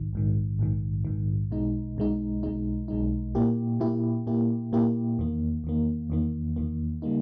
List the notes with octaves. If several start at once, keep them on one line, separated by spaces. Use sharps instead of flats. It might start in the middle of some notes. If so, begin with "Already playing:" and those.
Already playing: A#1 G#2 D#3
A#1 G#2 D#3
A#1 G#2 D#3
A#1 G#2 D#3
B1 B2 G#3 D#4
B1 B2 G#3 D#4
B1 B2 G#3 D#4
B1 B2 G#3 D#4
A#2 A#3 E4 G4
A#2 A#3 E4 G4
A#2 A#3 E4 G4
A#2 A#3 E4 G4
E2 D#3 A#3
E2 D#3 A#3
E2 D#3 A#3
E2 D#3 A#3
C#3 G3 A#3 D#4